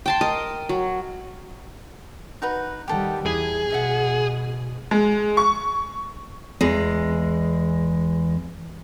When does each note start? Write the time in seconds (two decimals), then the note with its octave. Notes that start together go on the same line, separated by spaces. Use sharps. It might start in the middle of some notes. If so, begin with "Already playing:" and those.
0.06 G5 A5 C6
0.21 A#4 D#5
0.69 F#3
2.42 D#4 F#4 B4
2.88 D#3 G3 G4 A4 F#5
3.26 E2 E4 G#4
3.70 B2 D#5 E5 F#5
4.91 G#3
5.37 C#6
6.61 E2 G#3